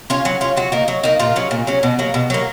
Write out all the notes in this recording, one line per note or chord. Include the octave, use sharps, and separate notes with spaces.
C#4 F4
F#3
C#4 F4
F#3 F#4
A#3 D#4
F#3
A#3 D#4
A#2 F4
F#3 C#4
A#2
F#3 C#4
B2
F#3 A#3
B2
F#3 A#3